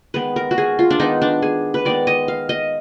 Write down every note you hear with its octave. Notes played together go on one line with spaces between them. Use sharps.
D#3 G#3 B3 B4
A#4
F#4
G#4
F4
D4
D#3 G#3 B3 D#4
D4
G#4
B4
D#3 G#3 B3 D5
D#5
F5
D#5